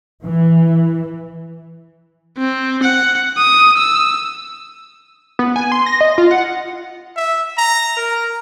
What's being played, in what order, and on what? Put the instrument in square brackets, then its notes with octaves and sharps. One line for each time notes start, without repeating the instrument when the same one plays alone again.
[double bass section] E3
[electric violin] C4
F#5
D#6
E6
[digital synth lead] B3
G#5
C6
A#6
D#5
F4
F#5
[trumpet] E5
A#5
A#4